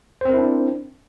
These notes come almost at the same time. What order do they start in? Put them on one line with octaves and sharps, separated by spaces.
C5 C4 A#4 E4 D4